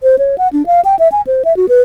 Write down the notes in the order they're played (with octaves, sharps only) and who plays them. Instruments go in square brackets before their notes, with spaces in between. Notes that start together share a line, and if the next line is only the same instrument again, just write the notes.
[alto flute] C5
C#5
F#5
D4
F5
G5
E5
G#5
C5
E5
F#4
B4